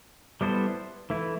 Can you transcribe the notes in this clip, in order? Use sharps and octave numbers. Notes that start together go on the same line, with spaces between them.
G3 B3 E4 A4 C5
E3 A3 E4